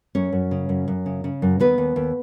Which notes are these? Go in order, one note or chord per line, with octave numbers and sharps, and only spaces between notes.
F#2 C#4 C#5
F#2
C#3
F#2
F#2
C#3
C#3
F#2
D#2 B3 B4
D#2
D#2